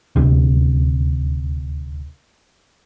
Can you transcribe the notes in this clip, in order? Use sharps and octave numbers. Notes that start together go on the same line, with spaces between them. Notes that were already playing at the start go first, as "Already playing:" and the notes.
D#1 D2 C3